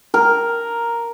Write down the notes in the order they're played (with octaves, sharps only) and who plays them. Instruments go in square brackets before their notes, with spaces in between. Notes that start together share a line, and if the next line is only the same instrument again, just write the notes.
[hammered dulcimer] A#4